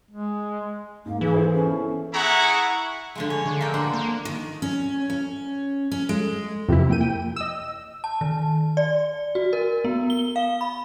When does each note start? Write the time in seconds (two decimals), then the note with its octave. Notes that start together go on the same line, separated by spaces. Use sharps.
0.11 G#3
1.06 G#2 A#3
1.21 E3 G#4
1.34 E4 A4 C5
1.54 C#4
1.67 B3
2.14 E4 G#4 F#5 A#5 C#6
3.15 D3 F3 G#3
3.30 C#5
3.46 D3
3.61 A#3 G5
3.74 D4 C5 F#5
3.93 A#3
4.25 D#3
4.62 C#4
5.10 C#4
5.92 C#4
6.09 G#3
6.69 F2 C3 E3 E4
6.89 A#3 G5 D#7
7.01 G5
7.36 D#5 E6
8.04 A5
8.21 D#3
8.77 D5
9.35 F#4
9.53 A#4
9.85 B3
10.10 G7
10.36 F5
10.61 B5